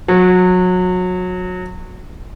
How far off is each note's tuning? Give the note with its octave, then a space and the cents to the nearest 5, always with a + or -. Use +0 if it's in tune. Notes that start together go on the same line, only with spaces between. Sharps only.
F#3 -25